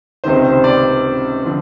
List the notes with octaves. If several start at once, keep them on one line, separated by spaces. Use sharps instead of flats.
C#2 C3 D#3 C5
C5
D5
D3 F3